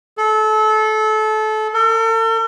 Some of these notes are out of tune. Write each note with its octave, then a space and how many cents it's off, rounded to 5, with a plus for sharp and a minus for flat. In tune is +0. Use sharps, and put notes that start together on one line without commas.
A4 -25
A4 +45